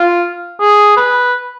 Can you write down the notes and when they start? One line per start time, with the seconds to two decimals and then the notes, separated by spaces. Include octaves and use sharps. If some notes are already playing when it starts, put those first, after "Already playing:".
Already playing: F4
0.60 G#4
0.97 B4